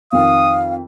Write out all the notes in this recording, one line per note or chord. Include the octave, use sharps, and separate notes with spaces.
F2 D#3 F5 D#6